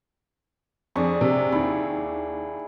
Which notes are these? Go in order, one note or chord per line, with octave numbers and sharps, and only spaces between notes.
F2 D4 G#4 C#6
C3
D#2 E4